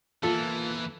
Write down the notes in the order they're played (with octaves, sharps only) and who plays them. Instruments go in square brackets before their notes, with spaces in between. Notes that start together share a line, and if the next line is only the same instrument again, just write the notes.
[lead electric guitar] E2 A#3 [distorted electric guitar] E3 [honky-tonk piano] F4 [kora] A4